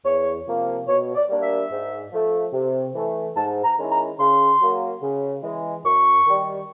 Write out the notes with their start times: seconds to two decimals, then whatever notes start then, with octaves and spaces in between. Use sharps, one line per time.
0.04 E2 C#5
0.47 C3 F3 A#3
0.87 B2 C#5
1.15 D5
1.29 G3 A#3 D4
1.42 E5
1.71 G#2
2.12 F3 A3
2.53 C3
2.94 E3 A3
3.36 G#2 A5
3.64 A#5
3.78 D#3 G#3 C#4 E4
3.91 A#5
4.19 C#3 C6
4.61 F#3 A#3
5.02 C#3
5.42 E3 G#3
5.84 F#2 C#6
6.26 D#3 G3